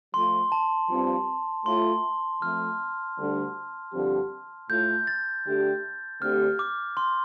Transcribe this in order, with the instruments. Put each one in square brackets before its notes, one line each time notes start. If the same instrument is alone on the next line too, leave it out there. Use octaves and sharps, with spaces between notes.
[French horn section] F3 A3 F4 [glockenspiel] C6
[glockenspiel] A5
[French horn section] G2 F3 C4
[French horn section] A2 A3 F4 [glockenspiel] C6
[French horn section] F2 F3 A3 [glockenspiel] F6
[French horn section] D2 D3 G3 D4 A4
G2 D3 F3 C4 G4
[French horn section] A2 A3 F4 [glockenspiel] G6
[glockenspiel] A6
[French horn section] D3 A3 D4 G4
[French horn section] D2 D3 A3 C4 G4 [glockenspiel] F6
[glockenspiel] D6
C6